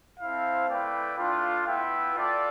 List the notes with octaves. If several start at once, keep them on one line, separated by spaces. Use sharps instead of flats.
C4 E4 A4 C5 F5
A3 E4 B4 D5 G5
A3 D4 F4
B3 E4 B4 E5 G5
F4 A4 D5